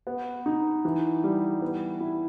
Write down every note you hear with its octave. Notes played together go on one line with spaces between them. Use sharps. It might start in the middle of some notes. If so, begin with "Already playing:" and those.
B3
D#4
E3
G3
B3
E4